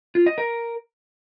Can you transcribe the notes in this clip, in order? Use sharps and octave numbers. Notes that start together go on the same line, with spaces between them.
F4
D#5
A#4